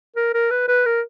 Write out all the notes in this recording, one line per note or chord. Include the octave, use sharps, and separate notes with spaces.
A#4
A#4
B4
B4
A#4